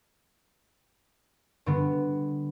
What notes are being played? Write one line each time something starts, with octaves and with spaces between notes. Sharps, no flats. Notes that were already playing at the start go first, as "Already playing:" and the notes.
G2 D3 B3